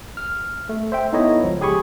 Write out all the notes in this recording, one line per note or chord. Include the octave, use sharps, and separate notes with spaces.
F6
A3
C5 E5 G5
B3 D#4 E4 A4 C#5 D#5
C#2 F3
G4 G#4 G#5 B5 C#6